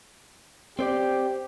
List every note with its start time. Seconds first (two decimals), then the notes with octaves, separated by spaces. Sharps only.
0.79 C4 G4 C5 D5